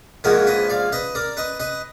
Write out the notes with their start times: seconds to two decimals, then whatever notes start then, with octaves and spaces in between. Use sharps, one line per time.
0.24 A#1 G#2 F3 F#4 A#4
0.47 B4 D#5
0.69 D5 F5
0.92 B4 D#5
1.15 A#4 D5
1.37 B4 D#5
1.60 B4 D#5